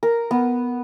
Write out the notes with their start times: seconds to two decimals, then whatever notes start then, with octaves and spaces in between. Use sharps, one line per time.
0.03 A#4
0.31 B3